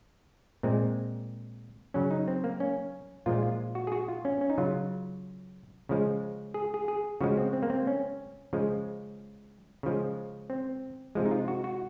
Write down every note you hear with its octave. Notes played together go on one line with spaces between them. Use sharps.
A#2 G#3 C4
C#3 F#3 C#4
D#4
C4
A#3
C#4
A#2 F3 G#3 F4
F4
F#4
G#4
F#4
F4
C#4
C#4
D#4
C#3 F#3 F4
C#3 F3 G#3
G#4
G#4
G#4
C#3 F3 G#3 F#4
C4
C4
A#3
C4
C#4
C#3 F3 G#3
C#3 F3 G#3
C4
C3 F3 G#3
D#4
F4
F#4
F#4